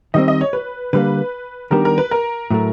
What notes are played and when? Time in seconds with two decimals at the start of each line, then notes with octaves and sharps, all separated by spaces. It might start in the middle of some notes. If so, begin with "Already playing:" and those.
0.14 D#3 G3 C4 D#5
0.28 D#5
0.41 C#5
0.53 B4
0.93 D3 G3 A#3 B4
1.71 D#3 G3 B3 D4 G4 A#4
1.85 A#4
1.98 B4
2.11 A#4
2.51 A2 F#3 A3